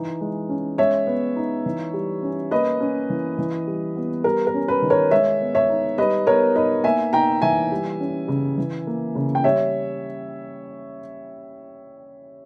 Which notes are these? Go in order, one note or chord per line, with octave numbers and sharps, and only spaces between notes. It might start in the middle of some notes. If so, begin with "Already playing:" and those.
Already playing: E3 D#4
G#3
C#4
G#3 C#5 E5
B3
D#4
E3
G3
C#4
A#3 B4 D#5
C#4
E3
E3
G3
B3
G3 A#4
A#4
C#4
B4
D#3
A#4 C#5
G#3 C#5 E5
B3
C#5 E5
D#4
G3 B4 D#5
B3 A#4 C#5
D#4 B4 D#5
A#3 E5 G#5
D#4 G5 A#5
E3 E5 G#5
G3
C#4
C#3
E3
A#3
C#3
G5
G3 C#5 E5